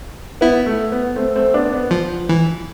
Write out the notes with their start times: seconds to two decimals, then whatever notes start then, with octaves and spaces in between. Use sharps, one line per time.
0.41 B3 E4
0.66 A3
0.92 B3
1.16 A3 C4
1.35 A3 C4
1.54 B3 D4
1.72 B3
1.91 F3
2.29 E3